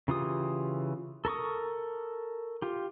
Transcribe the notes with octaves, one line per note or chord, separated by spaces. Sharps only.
C#3 E3 F4 G4 D#6
A4 A#4 C#6 D#6
F4 G4